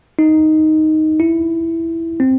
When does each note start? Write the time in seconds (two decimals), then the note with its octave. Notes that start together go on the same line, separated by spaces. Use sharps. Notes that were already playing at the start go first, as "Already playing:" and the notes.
0.19 D#4
1.20 E4
2.20 C4